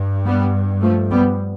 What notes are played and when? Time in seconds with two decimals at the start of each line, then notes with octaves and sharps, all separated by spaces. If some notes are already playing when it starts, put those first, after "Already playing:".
Already playing: G2
0.25 G3 B3
0.82 F3 A3
1.10 G3 B3